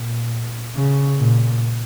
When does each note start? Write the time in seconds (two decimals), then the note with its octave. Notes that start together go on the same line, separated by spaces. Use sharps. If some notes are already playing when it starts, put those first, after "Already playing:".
Already playing: A#2
0.76 C#3
1.19 A#2